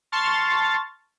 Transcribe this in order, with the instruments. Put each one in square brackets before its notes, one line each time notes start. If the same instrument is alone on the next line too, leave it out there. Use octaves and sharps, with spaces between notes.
[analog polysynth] A5 C6 C#6 F6 A6